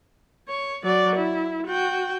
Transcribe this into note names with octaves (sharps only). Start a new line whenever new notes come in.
C#5
F#3 D5
E4
F#4 G5